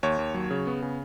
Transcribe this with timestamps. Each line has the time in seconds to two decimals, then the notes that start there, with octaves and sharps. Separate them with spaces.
0.03 D#2 C#5
0.19 D#2
0.34 F#3
0.51 C#3
0.67 B3
0.82 C#3